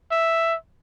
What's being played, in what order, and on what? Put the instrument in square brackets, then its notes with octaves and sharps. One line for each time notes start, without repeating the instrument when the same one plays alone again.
[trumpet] E5